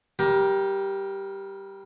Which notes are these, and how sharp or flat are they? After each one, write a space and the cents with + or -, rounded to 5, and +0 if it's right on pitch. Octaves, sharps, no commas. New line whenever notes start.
G3 +0 G4 +0 A#4 +20